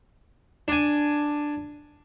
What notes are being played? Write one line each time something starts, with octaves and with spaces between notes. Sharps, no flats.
D4 G#5